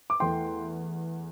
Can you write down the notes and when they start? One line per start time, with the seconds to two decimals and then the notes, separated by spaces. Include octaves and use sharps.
0.10 D6
0.20 E2 E3 A3 G5 C6